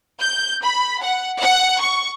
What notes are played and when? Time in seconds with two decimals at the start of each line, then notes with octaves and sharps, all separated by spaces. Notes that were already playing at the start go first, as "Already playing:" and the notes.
0.20 G6
0.62 B5
1.02 F#5
1.39 F#5
1.80 C#6